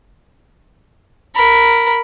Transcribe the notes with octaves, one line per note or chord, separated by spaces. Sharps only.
A#4 B5